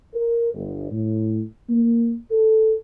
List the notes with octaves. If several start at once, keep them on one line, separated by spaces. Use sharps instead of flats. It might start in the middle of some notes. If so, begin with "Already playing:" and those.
A#4
G1
A2
A#3
A4